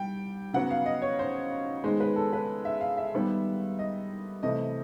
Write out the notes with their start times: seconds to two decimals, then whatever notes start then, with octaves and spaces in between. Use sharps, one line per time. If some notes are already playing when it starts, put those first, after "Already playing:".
Already playing: G3 G5
0.53 C#3 F#3 B3 F#5
0.71 F5
0.86 D#5
1.02 C#5
1.19 C5
1.83 D#3 G#3 B3 C5
2.00 B4
2.16 A4
2.33 B4
2.65 E5
2.81 F5
2.97 E5
3.14 D#3 G3 B3
3.79 D#5
4.43 C3 E3 A3 D#5